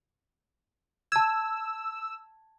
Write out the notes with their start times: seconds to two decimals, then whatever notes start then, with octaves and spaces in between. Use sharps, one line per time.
1.12 A5 E6 G#6